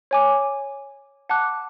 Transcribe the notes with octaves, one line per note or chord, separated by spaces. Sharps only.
C#5 G#5 D6
F#5 A5 D6 F#6